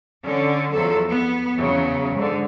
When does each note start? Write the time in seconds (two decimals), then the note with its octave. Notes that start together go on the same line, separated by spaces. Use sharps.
0.24 D3 C#4
0.73 E2 F3 F#3 A4
1.08 B3
1.58 E2 C#3 F#3
2.16 G#2 D3